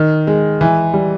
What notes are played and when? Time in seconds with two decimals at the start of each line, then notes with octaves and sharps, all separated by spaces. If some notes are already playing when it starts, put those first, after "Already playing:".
Already playing: D#3
0.27 G#3
0.61 E3
0.94 G3